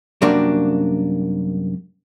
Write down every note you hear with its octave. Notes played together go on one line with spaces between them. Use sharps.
F#2 C3 G3 A#3 D4 F#4